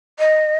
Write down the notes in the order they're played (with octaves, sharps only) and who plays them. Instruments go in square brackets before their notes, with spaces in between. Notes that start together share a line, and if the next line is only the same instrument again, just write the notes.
[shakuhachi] D#5